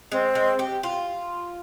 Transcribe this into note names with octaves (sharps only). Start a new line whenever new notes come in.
G#3 C4
G#3
G4
F4